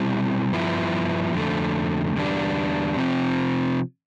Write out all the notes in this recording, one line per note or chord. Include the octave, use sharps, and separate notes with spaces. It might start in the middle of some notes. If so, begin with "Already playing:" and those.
Already playing: B2 G3 C4 E4
G2 F3 B3 E4
F2 D3 A3
E2 D3 G3 D4
C3 F3 C4